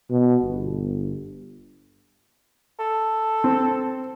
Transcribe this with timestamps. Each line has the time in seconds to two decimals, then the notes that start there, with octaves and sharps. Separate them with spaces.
0.10 B2
0.42 G1
2.79 A4
3.44 C4